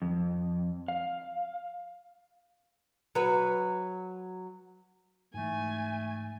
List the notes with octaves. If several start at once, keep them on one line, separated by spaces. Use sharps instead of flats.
F2
F5
F#3 B4
G#2 E3 A3 G#5